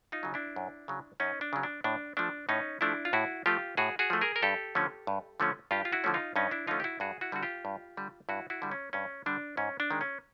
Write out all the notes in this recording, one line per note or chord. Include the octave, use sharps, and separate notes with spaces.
D#4 F4
C#3 F#3
D4 E4
F#2
C#3 F#3
F#2 C#4 D#4
D4
C#3 F#3
D4
A2 D4
F3 A3 D4
A2 C#4 D#4
F3 A3 D4 E4
F4
A2 E4 F#4
F3 A3 F4 G4
A2 F#4 G#4
F#4 G#4
F3 A3
G#4 A#4
A#4
G2 G4 A4
D3 F3 A3 C#4
G2
D3 F3 A3 C#4
G2 F4 G4
F4
E4 F#4
D3 F3 A3 C#4
D#4 F4
G2 C#4 D#4
D4 E4
D3 F3 A3 C#4 D#4 F4
G4
E4 F#4
G2 F#4 G#4
E4 F#4
D3 G3 F#4
F4 G4
G2
D3 G3
G2 E4 F#4
E4 F#4
D3 G3
C#4
G2 C#4
D3 G3 D4
G#2 C#4
D4
D#3 G#3
C#4